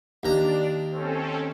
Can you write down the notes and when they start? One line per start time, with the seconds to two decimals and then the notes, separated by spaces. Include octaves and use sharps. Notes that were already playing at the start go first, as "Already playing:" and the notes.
0.23 D#2 D4 A#5
0.91 C4 C#4 A4